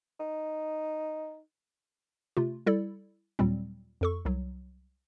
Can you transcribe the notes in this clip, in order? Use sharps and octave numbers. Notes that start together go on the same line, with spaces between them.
D#4
C3 A3 F4
G3 E4 A4 D5
D#2 A#2 F#3 G3 C4
F2 A4 C#6
C2 F#3